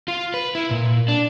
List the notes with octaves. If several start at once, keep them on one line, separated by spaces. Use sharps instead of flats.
F4
B4
E4
A#2
D4